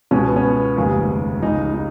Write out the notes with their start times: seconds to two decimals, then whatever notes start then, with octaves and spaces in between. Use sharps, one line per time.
0.11 C#2 B2 G#3 C#4
0.28 B3
0.36 C#4
0.44 B3
0.77 F1 D#2 C#3 G#3
1.42 C#2 C#3 G#3 D#4
1.74 D#4